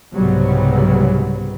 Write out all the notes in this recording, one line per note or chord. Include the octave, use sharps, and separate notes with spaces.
C2 G#2 C#3 F#3 G3 B3